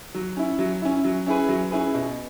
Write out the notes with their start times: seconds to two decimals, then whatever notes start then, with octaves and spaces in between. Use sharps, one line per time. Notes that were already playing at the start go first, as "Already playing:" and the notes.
0.14 F#3
0.37 C#4 E4
0.59 F#3
0.82 C#4 E4
1.04 F#3
1.27 C#4 E4 G#4 B4
1.49 F#3
1.71 C#4 E4 G#4 B4
1.94 B2